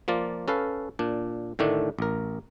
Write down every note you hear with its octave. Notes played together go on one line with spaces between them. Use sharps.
F3 A#3 F4 D5
C#4 A4 B4 F5
A#2 D4
A2 D3 D#3 A3 D4
A1 A#4